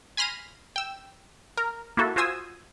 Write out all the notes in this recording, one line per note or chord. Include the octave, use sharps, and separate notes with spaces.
G#5 B5 C6 F6 A#6 D#7
G5 E6
A#4
A#3 E4 F#4 A4
F4 F#4 C5 G#5 D#6 E6